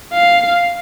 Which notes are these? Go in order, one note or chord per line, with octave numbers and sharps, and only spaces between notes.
F5